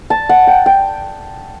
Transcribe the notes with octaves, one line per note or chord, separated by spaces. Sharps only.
A5
F#5
G5
G5